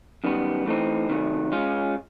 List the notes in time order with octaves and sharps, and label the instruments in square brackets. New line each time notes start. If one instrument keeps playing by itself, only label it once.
[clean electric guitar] F#2 D#3 G3 B3
E3 A3 C4 D#4
C3 D#3 F#3 A3
G#3 C#4 F4